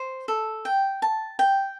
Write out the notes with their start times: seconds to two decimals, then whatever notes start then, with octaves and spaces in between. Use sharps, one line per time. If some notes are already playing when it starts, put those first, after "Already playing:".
Already playing: C5
0.28 A4
0.65 G5
1.02 A5
1.39 G5